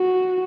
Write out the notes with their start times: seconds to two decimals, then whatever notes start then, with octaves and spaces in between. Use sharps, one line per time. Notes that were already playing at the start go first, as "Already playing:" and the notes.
Already playing: F#4